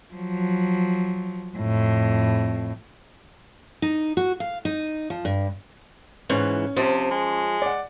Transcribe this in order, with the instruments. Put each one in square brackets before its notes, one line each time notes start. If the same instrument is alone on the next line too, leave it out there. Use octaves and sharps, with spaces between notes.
[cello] F3 F#3
F2 A2
[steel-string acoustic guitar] D#4
F#4
F5
D#4
F3
G2
[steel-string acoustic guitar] G#2 E3 [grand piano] C#4 C#5
[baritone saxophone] C3 [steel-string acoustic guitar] F3
[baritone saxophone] G#3
[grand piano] D5 F#5